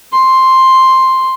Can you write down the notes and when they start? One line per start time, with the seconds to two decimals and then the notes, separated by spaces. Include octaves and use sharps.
0.13 C6